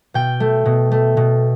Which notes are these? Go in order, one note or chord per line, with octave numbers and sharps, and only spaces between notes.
B2 G5
A3
B2
A3
B2